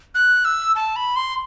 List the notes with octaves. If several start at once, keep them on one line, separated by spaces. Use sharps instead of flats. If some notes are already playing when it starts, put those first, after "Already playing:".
F#6
E6
A5
B5
C6